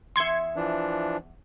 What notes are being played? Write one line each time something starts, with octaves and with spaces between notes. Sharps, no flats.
E2 E5 C6 G#6 C#7
E3 F3 D4